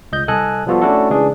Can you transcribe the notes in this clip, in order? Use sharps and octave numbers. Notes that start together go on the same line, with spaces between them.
C#2 D#5 G6
C2 A4 D#5 G#5 F#6
F3 G3 B3 F4 F#4 A4
A3 C#4 D4 E4 F#4 A4
C#3 E3 G#3 D4 G#4